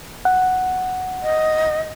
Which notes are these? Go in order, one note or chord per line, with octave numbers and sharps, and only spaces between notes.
F#5
D#5